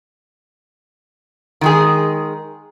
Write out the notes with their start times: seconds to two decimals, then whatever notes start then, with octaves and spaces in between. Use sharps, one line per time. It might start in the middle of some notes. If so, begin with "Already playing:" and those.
1.61 D#3 G#3 G#4